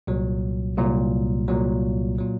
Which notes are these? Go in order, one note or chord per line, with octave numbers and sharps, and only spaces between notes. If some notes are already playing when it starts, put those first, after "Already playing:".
C2 A#2 F#3
C2 A#2 F#3
C2 A#2 F#3
A#2 F#3